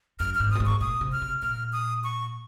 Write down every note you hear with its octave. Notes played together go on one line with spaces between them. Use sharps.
F#2 F6
F6
G#2
A#2 D#6
G#2
C#6
A#2 D#6
C3
F6
C3
A#2 F6
D#6
C#6